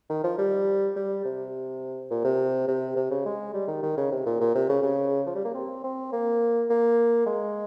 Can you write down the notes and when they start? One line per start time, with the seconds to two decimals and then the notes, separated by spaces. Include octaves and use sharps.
0.10 D#3
0.24 F3
0.38 G3
0.96 G3
1.25 C3
2.10 A#2
2.24 C3
2.68 C3
2.96 C3
3.11 C#3
3.25 G#3
3.53 G3
3.68 D#3
3.83 D#3
3.97 C#3
4.12 C3
4.26 A#2
4.40 A#2
4.55 C3
4.69 C#3
4.82 C#3
5.26 F3
5.35 G3
5.45 A#3
5.54 C4
5.84 C4
6.12 A#3
6.70 A#3
7.26 G#3